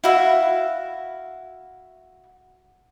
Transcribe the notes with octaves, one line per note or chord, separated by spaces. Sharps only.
E4 F#4 E5 F5